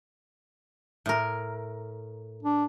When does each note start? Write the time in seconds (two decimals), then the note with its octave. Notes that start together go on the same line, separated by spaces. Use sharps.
1.06 A2 A#4
2.43 D4